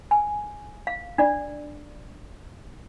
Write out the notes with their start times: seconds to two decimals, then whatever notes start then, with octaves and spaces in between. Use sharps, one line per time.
0.11 G#5
0.87 F5
1.18 D4 D5